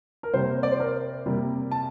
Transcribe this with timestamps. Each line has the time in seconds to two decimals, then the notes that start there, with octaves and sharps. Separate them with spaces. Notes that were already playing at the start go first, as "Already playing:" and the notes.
0.23 A#4
0.33 C3 G3 A#3 C5
0.63 D5
0.72 C5
0.80 A#4
1.26 C3 G3 A#3
1.71 A5